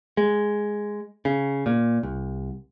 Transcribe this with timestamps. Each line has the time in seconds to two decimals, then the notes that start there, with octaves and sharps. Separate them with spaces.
0.17 G#3
1.25 C#3
1.66 A#2
2.03 C2